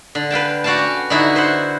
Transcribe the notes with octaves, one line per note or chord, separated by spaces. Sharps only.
D3
B4 F5 G5 A5
F#4 D5 F5 G5 A5
C#4
D3 D#4 E4 F#4 E5
B4 C5 E5 F#5